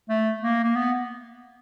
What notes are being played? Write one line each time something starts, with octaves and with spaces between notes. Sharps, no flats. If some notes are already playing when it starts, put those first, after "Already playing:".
A3
A#3
A#3
B3